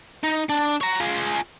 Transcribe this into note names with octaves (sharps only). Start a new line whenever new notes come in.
D#4
D4
C#5 A#5
F4 G#4